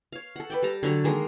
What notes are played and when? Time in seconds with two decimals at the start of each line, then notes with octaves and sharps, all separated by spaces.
0.12 C#5 F5
0.36 A4 F#5
0.50 B4 D5 G5
0.63 G3 G4 A5 A#5
0.83 D3 F#3 A4 C#5
1.04 D#3 G#3 A#3 D#5